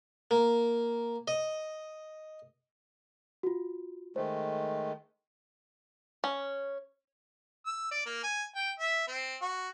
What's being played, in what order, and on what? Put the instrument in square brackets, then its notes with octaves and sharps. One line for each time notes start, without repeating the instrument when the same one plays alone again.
[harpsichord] A#3
D#5
[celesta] F4 F#4
[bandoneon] D#3 G#3 A3 [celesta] C5
[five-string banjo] C#4
[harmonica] E6
D5
A#3
G#5
G5
E5
C4
F#4